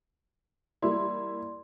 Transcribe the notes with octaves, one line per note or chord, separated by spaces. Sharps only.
G3 A#3 E4 D5 C6